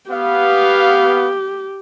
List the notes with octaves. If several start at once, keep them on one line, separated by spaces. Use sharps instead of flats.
B3 G4 F5